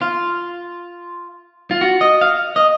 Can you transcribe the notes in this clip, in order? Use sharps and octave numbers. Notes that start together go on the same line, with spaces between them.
F4
F4
F#4
D#5
F5
D#5